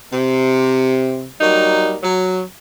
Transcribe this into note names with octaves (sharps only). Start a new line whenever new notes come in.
C3
F#3 G3 A#3 D#4
F#3